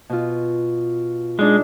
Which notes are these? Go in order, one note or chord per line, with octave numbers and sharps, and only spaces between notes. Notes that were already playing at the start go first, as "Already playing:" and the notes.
B2 F4
G#3 D4 D#4